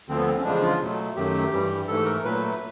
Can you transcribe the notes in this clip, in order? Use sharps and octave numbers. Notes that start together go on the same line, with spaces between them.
D2 D3 F3 C4
B3
C4
C#4
E2 C#3 F3 G#3 D4
F4
B2 F#3 A3
F#2 D#3 F#3 A3 G4
G2 E3 G3
G#2 E3 A3 A4
A#4
A#2 F#3 A3 B4